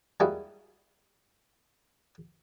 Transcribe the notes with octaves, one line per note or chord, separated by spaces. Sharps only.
G3 G#3 A#3 E4 F#4 G#4